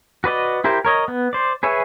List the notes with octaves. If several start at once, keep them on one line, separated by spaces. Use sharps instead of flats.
F#4 B4 D5 D#5
E4 G4 A#4 C5
A#4 C#5 D#5
B3
C5 D5
G#4 B4 C#5 E5 G#5